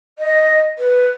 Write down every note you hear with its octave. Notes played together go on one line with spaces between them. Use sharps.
D#5
B4